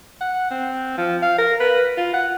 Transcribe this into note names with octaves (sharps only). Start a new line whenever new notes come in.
F#5
C4
F3
F5
A#4
B4
F4
F#5